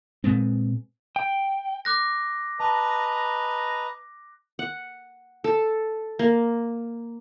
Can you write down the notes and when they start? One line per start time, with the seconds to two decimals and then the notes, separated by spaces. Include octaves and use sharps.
0.24 A#2 G#3 B3 C4
1.16 G5
1.85 D6 F#6 A#6
2.60 B4 D#5 A5 A#5
4.59 F#5
5.44 A4
6.19 A#3